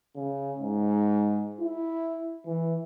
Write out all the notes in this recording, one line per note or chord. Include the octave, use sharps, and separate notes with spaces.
C#3
G#2
E4
E3